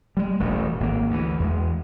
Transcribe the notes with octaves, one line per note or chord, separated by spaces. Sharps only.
G3 G#3
E1 A1 G2
G#1 A#3
D2 E3
E2 G3 G#3